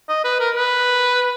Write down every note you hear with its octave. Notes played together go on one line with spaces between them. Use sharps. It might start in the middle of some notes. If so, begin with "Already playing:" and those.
D#5
B4
A#4
B4